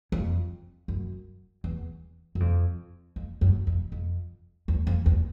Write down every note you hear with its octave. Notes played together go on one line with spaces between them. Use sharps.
F2
F#2
E2
F#2
F2
F2
F#2
F2
F2
E2
F2
E2